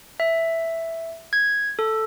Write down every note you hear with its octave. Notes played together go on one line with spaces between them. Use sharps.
E5
G#6
A4